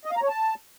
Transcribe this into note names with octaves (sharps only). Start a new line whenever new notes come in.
D#5
F5
A#5
C#5
A5